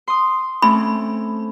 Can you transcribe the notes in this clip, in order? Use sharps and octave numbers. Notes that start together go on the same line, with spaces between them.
C6 D#6
A3 C4 C#4 B5